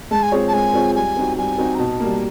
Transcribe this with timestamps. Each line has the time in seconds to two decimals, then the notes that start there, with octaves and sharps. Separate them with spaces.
0.11 G#3 A5
0.22 G#5
0.32 C4 F4 G#4 C#5
0.48 A5
0.53 G#3 G#5
0.74 C4 F4 G#4 C#5
0.95 G3 G#5
1.16 C4 D#4 F#4
1.38 G3 G#5
1.58 C4 D#4 F#4
1.74 A#5
1.79 B2 A5
2.00 G3 A#3